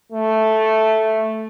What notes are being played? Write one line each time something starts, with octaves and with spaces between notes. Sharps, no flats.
A3